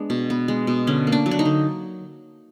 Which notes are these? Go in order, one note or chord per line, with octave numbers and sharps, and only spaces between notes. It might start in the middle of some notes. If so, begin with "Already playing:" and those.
Already playing: G#3 B3 D4
B2
B3
G#3
B2
D3 C#4
A#3
D4
F#3
D4
D#4
D3